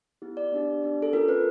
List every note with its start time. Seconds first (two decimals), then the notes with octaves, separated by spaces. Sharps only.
0.22 B3 E4 G4
0.37 D5
0.52 B3 D4 G4
0.83 B3 D4 G4
1.02 A4
1.13 C#4 F4 A4 A#4
1.28 B4